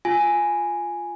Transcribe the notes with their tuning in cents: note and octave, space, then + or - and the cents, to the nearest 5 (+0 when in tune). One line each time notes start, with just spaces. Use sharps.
F4 +0 G#5 +0